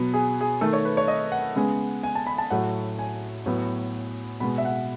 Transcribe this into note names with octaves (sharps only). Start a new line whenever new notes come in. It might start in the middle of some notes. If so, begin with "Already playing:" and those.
Already playing: B2 F#3 B3
G#4
G#4
D#3 A3 A4
C#5
B4
C#5
D#5
F#5
C#3 G#3 B3
G#5
A5
B5
A5
A2 F#3 A3 F#5
G#5
A2 F#3 B3
B2 G#3 B3 B5
E5
F#5